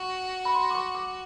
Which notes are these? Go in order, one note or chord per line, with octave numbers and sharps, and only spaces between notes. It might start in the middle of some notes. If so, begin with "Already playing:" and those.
Already playing: F#4 C#6
B5
C6
D6
C#6
D6